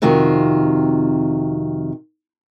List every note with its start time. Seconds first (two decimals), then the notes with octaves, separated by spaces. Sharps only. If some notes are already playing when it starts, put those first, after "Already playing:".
0.02 F2 C3 D#3 F4 F#4